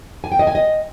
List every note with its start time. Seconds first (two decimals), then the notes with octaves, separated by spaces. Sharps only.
0.24 G#5
0.32 G5
0.39 D#5
0.47 G#5
0.55 D#5